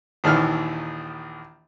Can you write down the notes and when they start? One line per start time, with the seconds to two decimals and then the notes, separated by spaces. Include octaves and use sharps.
0.24 A#1 D#2 D#3 E3 F6